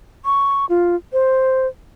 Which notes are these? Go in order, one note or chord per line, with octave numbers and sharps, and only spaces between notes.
C#6
F4
C5